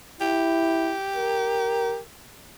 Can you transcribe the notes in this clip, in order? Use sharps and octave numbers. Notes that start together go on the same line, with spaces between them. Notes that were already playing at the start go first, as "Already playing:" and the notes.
E4 G4
A#4